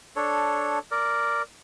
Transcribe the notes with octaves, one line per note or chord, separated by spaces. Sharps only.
D4 A4 C#5
A#4 D5